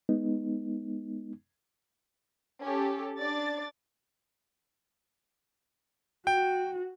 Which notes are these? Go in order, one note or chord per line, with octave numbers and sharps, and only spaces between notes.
G#3 B3 D#4
C#4 G4 A4
D4 D5 A6
F#4 G5